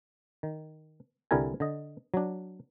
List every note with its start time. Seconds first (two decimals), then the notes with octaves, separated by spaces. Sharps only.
0.43 D#3
1.31 C2 D3 G3 E4 A#4 G#5
1.60 D3 D#5
2.14 F#3 D4